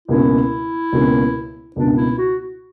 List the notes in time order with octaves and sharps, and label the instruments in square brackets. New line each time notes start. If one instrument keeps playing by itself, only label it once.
[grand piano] C#2 B2 A#3 C#4 [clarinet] E4
[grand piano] C#2 B2 A#3 C#4
[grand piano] C#2 B2 A#3 C#4 [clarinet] D4
[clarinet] E4
F#4